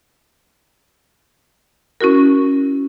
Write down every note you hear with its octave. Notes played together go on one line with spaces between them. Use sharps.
C#4 E4 F#4 A#4